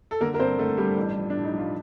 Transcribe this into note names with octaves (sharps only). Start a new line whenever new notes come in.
A4
D3 A#3 A#4
A#4
G2 C4 C5
D3 A3 A4
G2 G3 G4
A1
F3
A2 D4
D#4
F3
F4